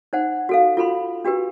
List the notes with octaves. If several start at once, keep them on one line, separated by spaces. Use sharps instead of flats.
D#4 C5 F#5
F#4 A4 F5
F4 F#4 A4 B5 C6
D4 F#4 G4 B4